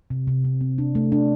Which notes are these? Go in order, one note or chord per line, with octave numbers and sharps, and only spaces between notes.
C3
C3
C4
C4
D4
A3
D4